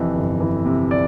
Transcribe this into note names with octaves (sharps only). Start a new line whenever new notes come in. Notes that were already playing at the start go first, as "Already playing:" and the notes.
Already playing: F2 C3 E3
G1
E3
C3
D5